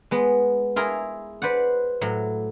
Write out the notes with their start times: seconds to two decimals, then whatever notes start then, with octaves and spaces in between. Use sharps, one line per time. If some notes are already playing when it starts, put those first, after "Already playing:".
0.11 G#3 B3
0.76 E4 F4 G#4 A#4
1.42 B4 C5 D5 F#5
2.01 A2 F#3